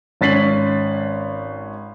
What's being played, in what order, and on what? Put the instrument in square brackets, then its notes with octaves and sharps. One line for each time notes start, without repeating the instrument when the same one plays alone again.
[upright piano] G#1 C#4 A6 B6 C7 F#7